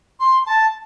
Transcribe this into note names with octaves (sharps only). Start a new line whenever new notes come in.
C6
A5